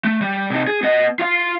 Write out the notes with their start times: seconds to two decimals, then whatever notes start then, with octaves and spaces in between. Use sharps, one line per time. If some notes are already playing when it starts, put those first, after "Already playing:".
0.04 A3
0.21 G3
0.50 C3 D#4
0.67 G#4
0.83 B3 D#5
1.19 F4 F5